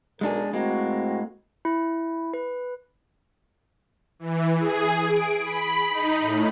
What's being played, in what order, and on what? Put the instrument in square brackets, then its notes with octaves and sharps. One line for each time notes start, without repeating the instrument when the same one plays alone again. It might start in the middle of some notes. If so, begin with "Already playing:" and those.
[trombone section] B1 A#4 [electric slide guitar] G#3 D4 G#4
[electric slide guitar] A2 G#3 A#3 [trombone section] C4 F#4
[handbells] E4
B4
[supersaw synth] E3
G#4
D7
B5
D#4
A2